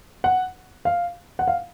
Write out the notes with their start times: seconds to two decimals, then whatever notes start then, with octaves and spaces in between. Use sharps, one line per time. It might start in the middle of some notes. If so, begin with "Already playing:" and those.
0.24 F#5
0.85 F5
1.39 F#5
1.48 F5